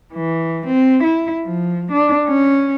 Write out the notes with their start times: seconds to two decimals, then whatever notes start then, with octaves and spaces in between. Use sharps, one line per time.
0.13 E3
0.67 C4
1.04 E4
1.45 F3
1.92 D4
2.28 C#4